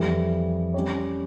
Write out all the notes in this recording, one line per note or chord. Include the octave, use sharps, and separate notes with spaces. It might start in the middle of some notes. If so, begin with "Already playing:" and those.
Already playing: F2 E3 G3
G3 C#4 G4 C#5